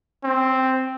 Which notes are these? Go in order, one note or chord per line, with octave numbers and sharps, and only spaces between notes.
C4